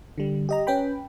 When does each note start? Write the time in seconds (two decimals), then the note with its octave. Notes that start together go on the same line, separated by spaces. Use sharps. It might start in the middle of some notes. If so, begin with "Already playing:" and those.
0.18 D3 G3
0.49 G4 D#5 A#5
0.67 C#4 B4 G5 B5